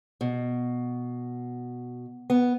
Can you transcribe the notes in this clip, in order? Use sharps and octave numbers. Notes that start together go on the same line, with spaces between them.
B2
B3